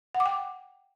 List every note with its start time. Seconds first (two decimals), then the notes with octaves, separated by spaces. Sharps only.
0.15 F#5
0.20 D6
0.26 G5